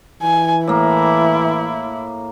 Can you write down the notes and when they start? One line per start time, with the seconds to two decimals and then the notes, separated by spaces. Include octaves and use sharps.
0.22 E3 G#5
0.67 A2 A#3 E4